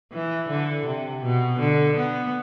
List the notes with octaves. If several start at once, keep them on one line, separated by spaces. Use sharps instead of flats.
E3
D3
C3
B2
D3
B3